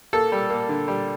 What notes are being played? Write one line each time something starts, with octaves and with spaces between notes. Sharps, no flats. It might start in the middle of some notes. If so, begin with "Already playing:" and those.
A#3 A4
G3
A#3
D3
G3